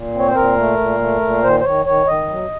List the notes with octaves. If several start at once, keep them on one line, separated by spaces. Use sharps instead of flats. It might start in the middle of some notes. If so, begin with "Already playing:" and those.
Already playing: A#2
C4
C#5
C5
A#2 A#4
A3
A#2
A3
A#2
D#3 C5
C5
D#3 C#5
D#3 C#5
D#3 D#5
F#3